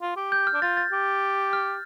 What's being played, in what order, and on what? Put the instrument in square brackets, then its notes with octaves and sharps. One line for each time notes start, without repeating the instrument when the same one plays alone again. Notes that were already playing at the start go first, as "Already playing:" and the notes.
[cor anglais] F4
G4
[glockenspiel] G6
F6
[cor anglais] D4
[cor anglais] F4 [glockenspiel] A6
[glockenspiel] A6
[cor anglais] G4
[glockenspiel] F6